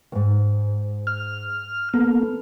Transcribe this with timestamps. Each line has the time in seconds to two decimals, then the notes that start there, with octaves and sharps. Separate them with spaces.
0.12 D#2 G#2
1.07 F6
1.94 A#3 B3 A4